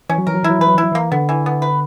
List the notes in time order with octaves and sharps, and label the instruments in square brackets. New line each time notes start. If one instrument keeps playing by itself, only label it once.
[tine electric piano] E3 [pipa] C#4
[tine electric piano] F#3
[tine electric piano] E3 [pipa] A#4
[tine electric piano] F#3
[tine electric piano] E3 [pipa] E4
[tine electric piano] F#3
[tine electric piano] E3 [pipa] B4
[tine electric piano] F#3
[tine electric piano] E3 [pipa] E4
[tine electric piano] F#3
[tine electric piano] E3 [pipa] A#3
[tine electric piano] D3 [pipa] B3
[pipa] E3
B3
B4